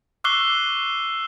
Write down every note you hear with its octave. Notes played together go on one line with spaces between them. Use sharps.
C#6 D6 E6 F#6 C7 G7